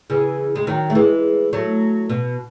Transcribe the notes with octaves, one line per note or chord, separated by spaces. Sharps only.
C#3 E3
G#3
D#3 F#3
A3
E3 G#3
F#3 A3
B2